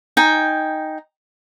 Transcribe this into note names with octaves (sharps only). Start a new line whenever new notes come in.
D#4 G5 G#5